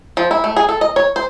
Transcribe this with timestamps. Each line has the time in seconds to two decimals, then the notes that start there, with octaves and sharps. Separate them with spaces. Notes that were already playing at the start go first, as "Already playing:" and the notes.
0.17 F3
0.31 E4
0.44 A3
0.56 G#4
0.69 A4
0.81 D#5
0.96 C#5
1.16 C5